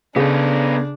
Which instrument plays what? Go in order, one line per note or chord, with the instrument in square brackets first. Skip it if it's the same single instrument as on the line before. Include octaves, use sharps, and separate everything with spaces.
[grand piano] C#3 [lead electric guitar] B3 A4 [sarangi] D4 [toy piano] G#4 F5